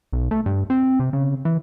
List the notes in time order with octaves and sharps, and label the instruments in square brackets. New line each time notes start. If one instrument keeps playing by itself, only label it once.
[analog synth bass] B1
A3
G2
C4
C3
C#3
E3